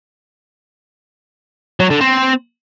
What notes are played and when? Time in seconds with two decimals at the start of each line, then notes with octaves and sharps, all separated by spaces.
1.80 F#3
1.90 D3
2.01 C4